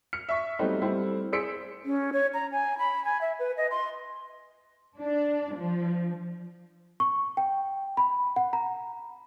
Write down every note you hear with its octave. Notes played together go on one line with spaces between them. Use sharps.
F6 C#7
E5 C#6 B6
F#3 G3 A3 B3 C4 D#4
G3 A3 C4 E4
G#4 C5 E6 B6 C#7 D7
C#4
C#5
A#5
G#5
B5
G#5
E5
B4
D#5
C6
D4
F3
C#6
G5
B5
F#5
A#5